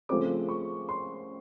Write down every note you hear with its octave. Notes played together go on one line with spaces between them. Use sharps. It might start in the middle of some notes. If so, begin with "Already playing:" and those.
C#3 F3 A3 C4 D6
C#6
C6